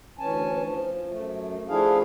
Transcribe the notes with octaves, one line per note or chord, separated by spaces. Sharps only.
D2 E3 C#4 G#5 A5
F3
F#2 A3
F3 A3 D4 E4 G#4 F5